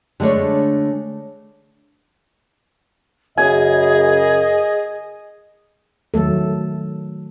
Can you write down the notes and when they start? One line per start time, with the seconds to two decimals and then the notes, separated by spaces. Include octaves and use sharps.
0.20 D3 G#3 A3 D4 C#5
3.37 F#2 C#3 G#4 D#5 G#5
6.14 D#3 F#3 A3 A4